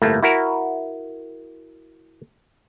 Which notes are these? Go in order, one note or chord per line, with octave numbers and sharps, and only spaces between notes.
G1 A2 A3 A#3
E4 F#4 A#4